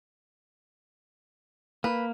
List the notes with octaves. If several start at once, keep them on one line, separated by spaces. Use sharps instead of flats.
A#3 B4